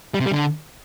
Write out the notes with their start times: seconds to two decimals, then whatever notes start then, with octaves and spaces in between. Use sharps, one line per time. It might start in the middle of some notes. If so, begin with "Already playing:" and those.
0.14 G3
0.20 C3
0.26 G3
0.32 D3